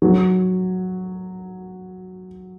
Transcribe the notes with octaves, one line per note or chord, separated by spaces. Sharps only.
F#3